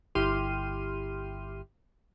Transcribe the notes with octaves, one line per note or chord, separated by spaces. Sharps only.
G1 E4 G4 C6 F6 D#7